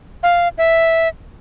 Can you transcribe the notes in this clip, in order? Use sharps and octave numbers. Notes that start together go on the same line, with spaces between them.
F5
E5